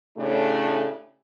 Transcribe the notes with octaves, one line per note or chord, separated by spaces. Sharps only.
A2 C#3 A3 D4 G4